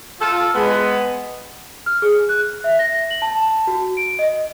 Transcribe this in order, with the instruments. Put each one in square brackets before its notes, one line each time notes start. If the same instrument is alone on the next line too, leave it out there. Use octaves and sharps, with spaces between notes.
[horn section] F4 A4
G#3 B3
[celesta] F6
G#4
F#6
E5
A#6
F#7
A5
F#4
D7
D#5